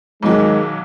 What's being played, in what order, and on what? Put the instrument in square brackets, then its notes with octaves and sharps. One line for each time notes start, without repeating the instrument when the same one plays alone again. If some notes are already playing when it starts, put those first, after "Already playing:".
[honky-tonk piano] B1 F#3 [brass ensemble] D#3 G#3